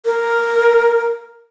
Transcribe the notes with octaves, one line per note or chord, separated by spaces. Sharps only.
A#4